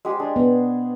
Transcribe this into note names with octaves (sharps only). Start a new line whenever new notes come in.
G#3 G4 C5
D4 G#4
B3